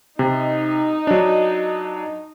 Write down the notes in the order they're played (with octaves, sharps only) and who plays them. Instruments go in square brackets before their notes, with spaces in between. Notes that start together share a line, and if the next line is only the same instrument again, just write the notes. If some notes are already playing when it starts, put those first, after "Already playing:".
[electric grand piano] C3 [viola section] D#4
[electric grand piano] F#3 D4